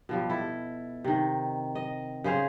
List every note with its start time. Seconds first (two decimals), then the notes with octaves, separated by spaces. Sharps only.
0.09 B2 F3 G3
0.30 E4 A4
1.04 C3 D#3
1.75 D#5
2.24 C#3 G#4 C5 F5